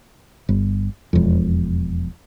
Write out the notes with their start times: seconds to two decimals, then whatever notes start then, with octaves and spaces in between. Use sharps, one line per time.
0.49 G1
1.13 E1 F2